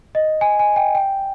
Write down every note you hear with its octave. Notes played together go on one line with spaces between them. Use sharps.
D#5
G#5
G#5
G5
G5